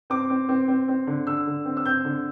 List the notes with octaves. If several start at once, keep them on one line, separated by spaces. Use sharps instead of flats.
C4 D6
C4
C4
C4
C4
D3
D3 E6
D3
C4
E6
C4 G6
D3